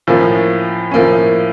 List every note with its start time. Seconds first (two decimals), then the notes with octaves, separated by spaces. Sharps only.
0.07 A2 F3 A#3 C#4
0.91 A2 F3 A#3 C#4